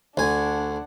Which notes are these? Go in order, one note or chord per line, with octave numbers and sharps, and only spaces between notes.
D2 D4 F#5 G#5